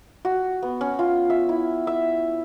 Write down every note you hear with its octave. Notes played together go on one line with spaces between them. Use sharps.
F#4
B3
C#4
F4
E5
E4
E5